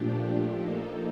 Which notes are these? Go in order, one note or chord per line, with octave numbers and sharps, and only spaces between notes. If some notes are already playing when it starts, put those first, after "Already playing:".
Already playing: A#2 F3 A3 D4 G4
F3 A#3 D#4 A4